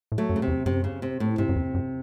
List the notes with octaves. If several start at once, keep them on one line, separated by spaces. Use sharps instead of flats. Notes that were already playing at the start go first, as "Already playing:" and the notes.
A2
F#3 A3
F#2
C#3
C3
E2
F#2 C3
C#3
C3
A2
G#2 C3
F#2
E2
F#2